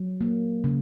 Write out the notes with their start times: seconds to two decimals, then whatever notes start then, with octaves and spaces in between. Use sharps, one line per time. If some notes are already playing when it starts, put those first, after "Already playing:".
Already playing: F#3
0.21 A#3
0.64 C#3